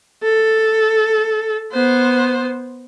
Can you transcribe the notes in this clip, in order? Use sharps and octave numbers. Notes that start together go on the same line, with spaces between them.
A4
B3 C5